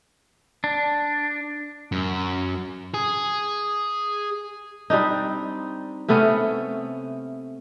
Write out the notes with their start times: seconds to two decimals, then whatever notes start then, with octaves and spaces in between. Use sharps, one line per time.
0.64 D4
1.92 F#2
2.94 G#4
4.90 G3 C4 D4 D#4
6.08 C3 A3 B3 C#4